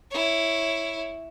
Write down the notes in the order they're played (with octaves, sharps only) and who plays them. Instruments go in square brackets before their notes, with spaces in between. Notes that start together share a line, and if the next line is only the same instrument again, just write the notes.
[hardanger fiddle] E4 C#5